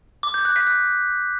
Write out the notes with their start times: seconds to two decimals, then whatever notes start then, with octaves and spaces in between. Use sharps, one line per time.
0.23 D6
0.34 G6
0.45 F#6
0.56 B6
0.67 F#6